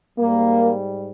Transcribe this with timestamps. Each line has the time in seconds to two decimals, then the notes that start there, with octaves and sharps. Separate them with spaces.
0.18 G#2 G3 A#3